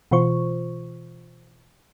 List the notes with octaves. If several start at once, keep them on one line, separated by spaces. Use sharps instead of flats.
B2 E3 F4 C5 C#6